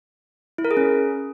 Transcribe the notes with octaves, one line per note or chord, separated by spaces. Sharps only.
E4
A#4
G#4
C#4